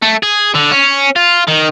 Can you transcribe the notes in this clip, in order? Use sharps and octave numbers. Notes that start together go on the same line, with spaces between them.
A3
G#4
D3
C#4
F4
D#3